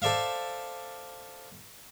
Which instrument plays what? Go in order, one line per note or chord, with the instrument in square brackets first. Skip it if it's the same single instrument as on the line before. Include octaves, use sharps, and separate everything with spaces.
[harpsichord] A4 C5 D5 E5 F5